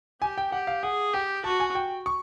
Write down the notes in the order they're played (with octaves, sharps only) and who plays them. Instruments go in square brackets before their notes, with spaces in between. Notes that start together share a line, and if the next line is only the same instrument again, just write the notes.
[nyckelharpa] G4 [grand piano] G#5
[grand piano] G5
[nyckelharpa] G4 [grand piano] F#5
[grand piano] F5
[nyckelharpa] G#4 [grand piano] F#5
[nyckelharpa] G4 [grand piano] G5
[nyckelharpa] F#4 [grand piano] A5
[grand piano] G#5
G5
C#6